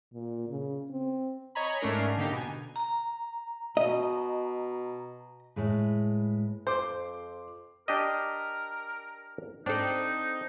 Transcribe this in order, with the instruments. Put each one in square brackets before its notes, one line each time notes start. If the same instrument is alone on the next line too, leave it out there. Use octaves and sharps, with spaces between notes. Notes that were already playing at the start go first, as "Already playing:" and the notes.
[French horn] A#2
C#3
C4
[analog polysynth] C#5 D#5 G#5 A#5 B5
G#2 A3 C#4 D4 A#4 C7
D3 A#3 D#4 G4
B2 G#5
[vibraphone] A#5
[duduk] B2 [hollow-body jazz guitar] D#5
[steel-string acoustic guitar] A2 G#3 B4
[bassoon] F2 [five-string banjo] C5 [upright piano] C6 D6
[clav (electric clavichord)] D4 G4 D#5 [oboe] A#4
[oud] C4 A4 [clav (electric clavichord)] D4 [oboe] D#4